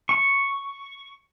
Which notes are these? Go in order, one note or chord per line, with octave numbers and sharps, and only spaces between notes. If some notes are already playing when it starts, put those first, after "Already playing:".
C#6